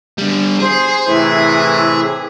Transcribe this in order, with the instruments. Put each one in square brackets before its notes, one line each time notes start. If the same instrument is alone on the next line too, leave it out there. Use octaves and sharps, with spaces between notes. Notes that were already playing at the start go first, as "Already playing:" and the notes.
[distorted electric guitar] D3 G3
[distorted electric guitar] G#4 [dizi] C5
[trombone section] A2 C3 E3 [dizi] E4